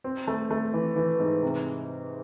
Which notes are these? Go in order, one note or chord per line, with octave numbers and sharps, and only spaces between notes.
C4
A3
A3
E3
E3
G#2
C3